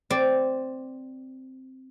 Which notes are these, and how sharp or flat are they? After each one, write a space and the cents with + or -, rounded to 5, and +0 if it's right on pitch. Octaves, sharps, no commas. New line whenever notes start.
C4 +0 D5 +0